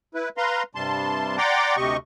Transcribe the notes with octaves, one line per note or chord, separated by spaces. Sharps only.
E4 B4
B4 F5 A#5 C6
G2 C3 G3 A5 C6
D5 F#5 G5 A#5 C6 D6
D2 C3 G4 D#5 C#6